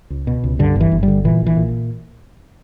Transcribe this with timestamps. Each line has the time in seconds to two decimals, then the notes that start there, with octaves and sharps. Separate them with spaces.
0.10 C#2
0.27 B2
0.44 C#2
0.59 G2 D3
0.76 G1 E3
0.91 G1
1.03 G3
1.08 D3
1.25 A#2 E3
1.42 A#1 E3
1.57 A#2